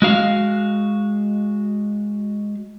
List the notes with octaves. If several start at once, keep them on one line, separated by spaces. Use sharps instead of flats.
G#3 F#4 F5